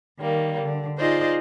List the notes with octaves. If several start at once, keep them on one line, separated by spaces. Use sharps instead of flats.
D#3 G3 A#3
D3
D#4 F4 G#4 C5 D5 D#5